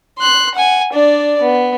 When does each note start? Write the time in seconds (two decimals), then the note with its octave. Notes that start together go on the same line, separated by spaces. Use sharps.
0.19 C6 F#6
0.55 F#5 G#5
0.93 D4 D5
1.42 B3